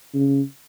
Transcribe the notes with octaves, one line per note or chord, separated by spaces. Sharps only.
C#3